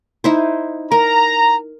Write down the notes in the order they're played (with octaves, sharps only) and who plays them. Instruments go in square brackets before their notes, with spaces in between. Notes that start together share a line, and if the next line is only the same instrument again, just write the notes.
[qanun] D#4 E4 C5
[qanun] A#4 [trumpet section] A#5